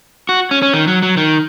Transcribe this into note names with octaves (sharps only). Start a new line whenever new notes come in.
F#4
C#4
C#4
D#3
F#3
F#3
D#3